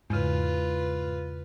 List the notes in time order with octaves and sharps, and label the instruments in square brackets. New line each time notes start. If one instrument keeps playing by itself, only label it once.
[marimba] E2 C#3 [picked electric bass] G#2 [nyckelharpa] F4 B4